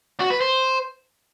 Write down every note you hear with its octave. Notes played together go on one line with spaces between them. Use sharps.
F#4
B4
C5